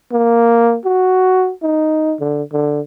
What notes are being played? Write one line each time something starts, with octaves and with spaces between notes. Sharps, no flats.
A#3
F#4
D#4
D3
D3